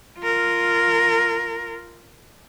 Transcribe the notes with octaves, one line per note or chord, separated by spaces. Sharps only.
F4 A#4